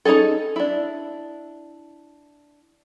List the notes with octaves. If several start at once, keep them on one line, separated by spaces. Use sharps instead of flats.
C#4 D#4 E4 G#4 A4
D4 E4